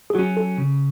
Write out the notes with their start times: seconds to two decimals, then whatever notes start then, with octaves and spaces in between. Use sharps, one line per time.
0.10 G#4
0.15 F#3 C#4 F#4
0.37 A4
0.58 C#3